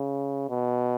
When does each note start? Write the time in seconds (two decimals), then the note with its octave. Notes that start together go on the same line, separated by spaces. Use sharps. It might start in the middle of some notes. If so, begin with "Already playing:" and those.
Already playing: C#3
0.49 B2